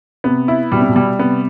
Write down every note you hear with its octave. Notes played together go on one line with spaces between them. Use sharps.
C3 B3
E4
B2 G3
C3
B2
G3
C3 B3